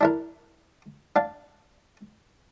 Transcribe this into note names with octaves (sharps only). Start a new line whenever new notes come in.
D4 E4 A#4
D4 F5